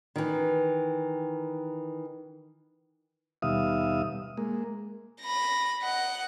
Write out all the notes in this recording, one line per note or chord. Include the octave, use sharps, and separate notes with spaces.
D#3 E3
D#2 B2 G3 E5 F5 D#6
G#3 A#3
B5 A#6
D#5 F#5